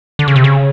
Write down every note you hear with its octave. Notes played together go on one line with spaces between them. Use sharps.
D3
C#3
C3
C#3